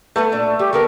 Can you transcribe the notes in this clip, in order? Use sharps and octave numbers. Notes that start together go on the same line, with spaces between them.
A3 B3 A4 B4
A#2 D4
G3 G4
D3 B3 G4 A#4